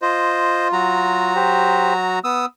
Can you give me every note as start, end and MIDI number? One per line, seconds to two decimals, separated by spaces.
0.02 1.33 65
0.02 0.68 72
0.02 0.68 75
0.73 2.19 54
0.73 2.19 66
0.73 2.19 82
1.36 1.93 67
1.36 1.93 72
2.24 2.46 59
2.24 2.46 87
2.24 2.46 88